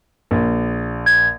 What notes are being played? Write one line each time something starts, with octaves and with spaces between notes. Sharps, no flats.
A#1
G#6